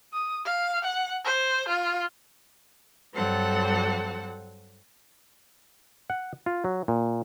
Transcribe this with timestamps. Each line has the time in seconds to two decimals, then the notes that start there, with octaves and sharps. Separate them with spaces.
0.13 D#6
0.45 F5
0.84 F#5
1.25 C5
1.68 F4
3.14 G2 F#3 C4 A4 F#5
6.10 F#5
6.46 F4
6.64 F#3
6.88 A#2